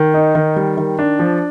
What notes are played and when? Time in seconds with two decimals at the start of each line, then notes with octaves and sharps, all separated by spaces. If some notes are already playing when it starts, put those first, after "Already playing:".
Already playing: D#3
0.14 D#4
0.35 D#3
0.56 G3
0.77 D#3
0.99 D4
1.19 F3